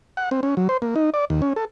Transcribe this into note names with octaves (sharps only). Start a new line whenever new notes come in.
F#5
C4
C#4
F#3
C5
A#3
D#4
D5
D#2
C#4
A4